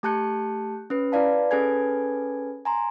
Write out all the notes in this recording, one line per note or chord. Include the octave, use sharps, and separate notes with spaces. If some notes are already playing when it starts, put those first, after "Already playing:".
A3 G4 A5 F#6 G6 C#7
C#4 B4
E4 B4 D5 F5 A5
C#4 G#4 A4 B4 G#5 G#6
G#5 A#5 C6